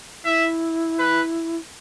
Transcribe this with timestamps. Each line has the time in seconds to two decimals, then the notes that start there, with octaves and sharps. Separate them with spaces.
0.24 E4 E5
0.99 B4